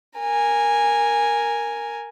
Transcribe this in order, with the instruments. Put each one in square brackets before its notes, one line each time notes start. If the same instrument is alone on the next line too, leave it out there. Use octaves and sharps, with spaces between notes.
[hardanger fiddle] A#4 G#5